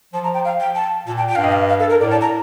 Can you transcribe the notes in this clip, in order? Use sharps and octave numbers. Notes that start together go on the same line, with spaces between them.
F3 A5
A#5
G5
F5
G5
A5
A#2 A5
G5
G5
G2 F5
D#5
F5
F5
A4
A#4
A2 D5
A5
A#5